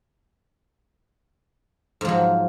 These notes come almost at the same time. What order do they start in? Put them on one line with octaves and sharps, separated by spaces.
G#2 F3 F#3